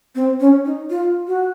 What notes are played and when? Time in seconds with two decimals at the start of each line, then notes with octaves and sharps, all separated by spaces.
0.15 C4
0.40 C#4
0.65 D#4
0.90 F4
1.27 F#4